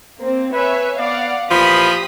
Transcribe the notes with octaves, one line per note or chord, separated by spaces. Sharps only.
A#3 C4
B4 C#5 E5 G#5
B3 D5 F5 F#5
A#2 E3 F3 G4 B5 D#6 B6